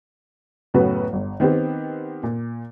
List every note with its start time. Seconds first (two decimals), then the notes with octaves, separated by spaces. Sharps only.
0.74 F#2 A2 C#3 B3 F#4 B4
1.13 G1
1.40 D#3 B3 C4 G4
2.23 A#2